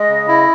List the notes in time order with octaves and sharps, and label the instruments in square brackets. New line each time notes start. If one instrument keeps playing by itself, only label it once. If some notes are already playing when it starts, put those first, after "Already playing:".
Already playing: [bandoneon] G#3 [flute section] D#5
[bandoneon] C#3
E4